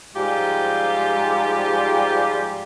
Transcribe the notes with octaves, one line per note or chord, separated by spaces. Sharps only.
G#2 F3 G3 F4 G4